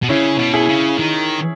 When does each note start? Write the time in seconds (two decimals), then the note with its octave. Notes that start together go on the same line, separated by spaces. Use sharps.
0.03 B2
0.09 C#3 C#4 E4
0.39 B2
0.53 E4 G#4
0.69 C#3
0.98 D#3